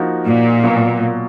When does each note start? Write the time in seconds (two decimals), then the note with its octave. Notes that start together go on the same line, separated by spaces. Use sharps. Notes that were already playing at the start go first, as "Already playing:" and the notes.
Already playing: F3 A#3 D#4 F#4
0.27 A#2
0.63 B2 F#3 A#3 F4